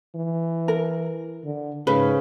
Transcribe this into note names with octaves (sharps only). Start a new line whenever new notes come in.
E3
A#4
D3
G#2 C#3 B4